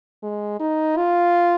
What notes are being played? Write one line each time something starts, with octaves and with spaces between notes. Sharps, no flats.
G#3
D#4
F4